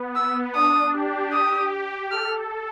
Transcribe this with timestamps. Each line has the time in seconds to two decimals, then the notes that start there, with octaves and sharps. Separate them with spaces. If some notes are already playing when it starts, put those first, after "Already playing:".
Already playing: B3
0.16 E6
0.54 D4 D#6
0.94 G4
1.33 D#6
2.11 A4 F6